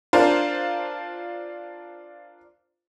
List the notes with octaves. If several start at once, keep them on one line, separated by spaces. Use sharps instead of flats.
D4 F4 A#4 C5